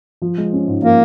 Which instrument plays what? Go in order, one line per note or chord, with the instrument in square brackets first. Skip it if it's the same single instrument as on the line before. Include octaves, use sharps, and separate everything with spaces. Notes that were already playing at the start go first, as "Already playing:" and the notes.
[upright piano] F3
G#3
C#4
G#2
[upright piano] F3 [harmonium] A#3